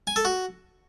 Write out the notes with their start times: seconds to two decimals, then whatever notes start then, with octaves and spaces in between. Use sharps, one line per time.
0.07 G#5
0.16 A4
0.25 F#4